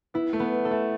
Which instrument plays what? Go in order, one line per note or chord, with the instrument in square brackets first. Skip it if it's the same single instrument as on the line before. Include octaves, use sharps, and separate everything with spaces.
[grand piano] B3 [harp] E4
[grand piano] A3
[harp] B3
A4
[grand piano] A3